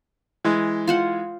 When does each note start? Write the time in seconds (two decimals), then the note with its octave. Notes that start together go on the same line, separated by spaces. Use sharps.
0.44 E3 G#3
0.87 F4 C5 F#5